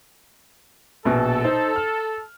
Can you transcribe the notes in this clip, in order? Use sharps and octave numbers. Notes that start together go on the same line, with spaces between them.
A#1 B2 A4
D#4 C5
F6